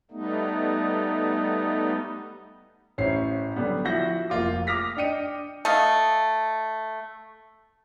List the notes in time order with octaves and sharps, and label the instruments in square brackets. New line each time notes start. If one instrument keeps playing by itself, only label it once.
[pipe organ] G3 A3 B3 D#4
[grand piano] A1 C#4 E4 C5 C7
D3 F#3 G3 B3
F3 E4 F#4 F#5 G6 A#6
F1 F2 A#3 F4 D6
D6 D#6 F6 A#6 B6
D4 D#5 G5 C#7 D#7
[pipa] A3 D#5 F5